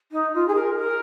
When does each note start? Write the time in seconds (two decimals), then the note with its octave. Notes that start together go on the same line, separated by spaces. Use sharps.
0.12 D#4
0.34 F4
0.47 G#4
0.54 A#4
0.77 A#4